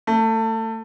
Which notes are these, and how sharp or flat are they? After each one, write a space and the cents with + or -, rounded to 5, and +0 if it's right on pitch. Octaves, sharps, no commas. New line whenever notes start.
A3 +25